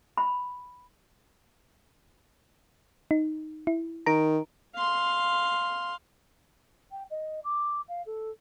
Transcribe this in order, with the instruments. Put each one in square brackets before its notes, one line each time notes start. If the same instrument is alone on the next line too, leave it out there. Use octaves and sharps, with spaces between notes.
[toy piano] B5
[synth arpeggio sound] D#4
E4
[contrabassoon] D#3 [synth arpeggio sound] A#5 D7
[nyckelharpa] F5 C6
[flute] G5
D#5
D6
F5
A4